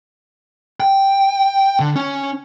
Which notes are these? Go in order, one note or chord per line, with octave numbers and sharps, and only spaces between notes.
G5
D3
C#4